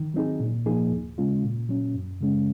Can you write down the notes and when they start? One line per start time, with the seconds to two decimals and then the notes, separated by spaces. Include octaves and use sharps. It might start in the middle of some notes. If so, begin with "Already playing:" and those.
Already playing: D#3
0.14 F#3 C4 D#4 G#4
0.40 A#2
0.66 F3 A#3 D#4 G#4
0.91 D#2
1.18 C#3 G#3 C#4 F4
1.44 A#2
1.69 F#3 C#4
1.94 F#2
2.21 C#3 G#3 C#4